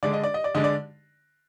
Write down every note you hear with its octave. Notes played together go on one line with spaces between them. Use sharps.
D3 G#3 D4 D5
D#5
D5
D#5
D5
D3 G#3 D4 D#5
D5